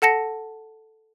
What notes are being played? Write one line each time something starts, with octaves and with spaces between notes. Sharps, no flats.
A4 F#5 A5 A#6 C#7